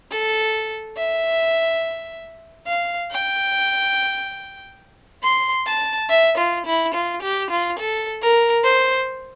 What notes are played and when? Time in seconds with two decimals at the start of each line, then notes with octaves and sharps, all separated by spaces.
0.12 A4
0.97 E5
2.67 F5
3.11 G5
5.23 C6
5.66 A5
6.09 E5
6.38 F4
6.66 E4
6.94 F4
7.22 G4
7.50 F4
7.79 A4
8.22 A#4
8.64 C5